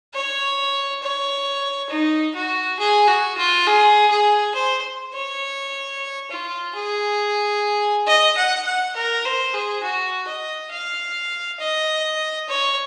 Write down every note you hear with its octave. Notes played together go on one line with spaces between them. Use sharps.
C#5
C#5
D#4
F#4
G#4
F#4
F4
G#4
G#4
C5
C#5
F4
G#4
D#5
F#5
F#5
A#4
C5
G#4
F#4
D#5
F5
D#5
C#5